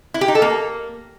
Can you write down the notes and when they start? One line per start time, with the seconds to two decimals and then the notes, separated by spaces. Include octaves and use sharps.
0.14 E4
0.21 G4
0.28 D#4
0.35 A4
0.42 A#3